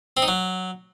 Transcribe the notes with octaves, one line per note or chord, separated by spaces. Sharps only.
C4
D#4
F#3